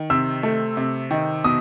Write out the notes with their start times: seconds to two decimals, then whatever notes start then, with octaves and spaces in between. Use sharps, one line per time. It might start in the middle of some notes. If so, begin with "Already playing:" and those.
Already playing: D#3
0.10 C3 E6
0.43 A3
0.77 C3
1.11 D#3
1.44 B2 D#6